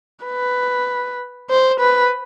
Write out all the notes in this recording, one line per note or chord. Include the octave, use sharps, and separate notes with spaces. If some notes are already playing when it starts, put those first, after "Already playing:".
B4
C5
B4